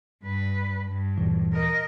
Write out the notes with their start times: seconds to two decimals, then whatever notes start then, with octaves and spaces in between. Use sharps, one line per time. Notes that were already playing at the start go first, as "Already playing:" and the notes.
0.23 G2 B4
0.87 G2
1.18 D#2 A#2 E3
1.53 A#4 D#5